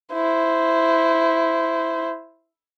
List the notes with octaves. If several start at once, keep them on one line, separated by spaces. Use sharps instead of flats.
E4 C5